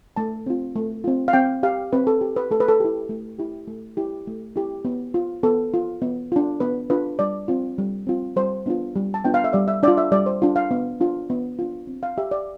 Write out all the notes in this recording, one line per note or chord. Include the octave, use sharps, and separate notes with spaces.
A3 A5
C4 F4
A3
C4 F4
F5
C4 G5
G4 F5
C4 B4
A4
G4
B4
A3 A4
B4
A4
E4 G4
A3
E4 G4
A3
E4 G4
A3
E4 G4
B3
F4
B3 A4
F4
B3
D4 F4
B3 B4
D4 F4 B4
G3 D5
C4 F4
G3
C4 F4
G3 C5
B3 D4 F4
G3
A5
B3 D4 F4 G5
F5
E5
G3 D5
E5
D4 F4 D5
E5
G3 D5
C5
D4 F4
F5
B3
D4 F4
B3
D4 F4
C4
F5
G4 E5
D5